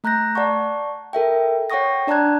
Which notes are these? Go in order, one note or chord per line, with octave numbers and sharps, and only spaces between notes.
A3 A#5 F#6 G6 A#6
D5 F#5 A5 C#6
A4 A#4 E5 G5
C#5 F#5 G5 C#6 D#6 A#6
D4 D5 A5 A#5 F#6 G#6